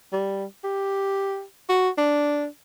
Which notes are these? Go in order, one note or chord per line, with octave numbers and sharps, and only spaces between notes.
G3
G4
F#4
D4